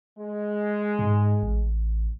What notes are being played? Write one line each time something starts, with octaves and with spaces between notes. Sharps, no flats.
G#3
G#2
A1